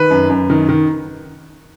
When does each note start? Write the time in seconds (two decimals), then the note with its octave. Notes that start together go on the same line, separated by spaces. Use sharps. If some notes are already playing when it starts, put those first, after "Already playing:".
Already playing: D#3 B4
0.11 F#2
0.30 F#2
0.50 D#3
0.69 D#3